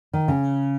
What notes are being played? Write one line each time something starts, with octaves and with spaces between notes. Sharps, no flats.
D#3
C#3